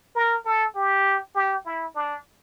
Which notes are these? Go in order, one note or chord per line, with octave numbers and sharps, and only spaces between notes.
A#4
A4
G4
G4
E4
D4